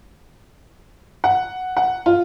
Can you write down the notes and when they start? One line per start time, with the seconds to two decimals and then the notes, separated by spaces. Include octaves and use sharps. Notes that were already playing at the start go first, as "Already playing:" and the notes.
1.24 F#5
1.77 F#5
2.06 F4